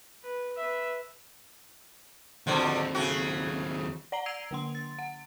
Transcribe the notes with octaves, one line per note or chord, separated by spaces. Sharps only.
B4
B4 E5
D#2 B2 D3 F3 C4
C#3 A3 F#4
D5 F#5 A#5 C7 F#7 G7
E6 G#6 C7 D7 D#7 F7
D3 A#3 C6
A6
F#5